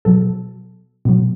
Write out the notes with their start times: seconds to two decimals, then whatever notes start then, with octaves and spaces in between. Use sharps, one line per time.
0.05 B2 F#3 A4
1.05 B2 F#3